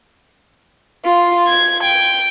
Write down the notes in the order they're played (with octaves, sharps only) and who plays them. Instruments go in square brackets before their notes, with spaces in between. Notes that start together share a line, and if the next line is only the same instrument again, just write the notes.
[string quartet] F4
G#6
G5